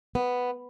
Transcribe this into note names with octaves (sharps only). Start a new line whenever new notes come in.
B3